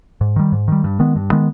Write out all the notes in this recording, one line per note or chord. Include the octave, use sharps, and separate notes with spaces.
G#2
D#3 G3
G#2
D#3 G3
G2
D#3 G#3 B3
G2
D#3 G#3 B3